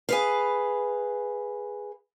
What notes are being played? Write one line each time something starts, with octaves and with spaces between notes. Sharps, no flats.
G#4 B4 F5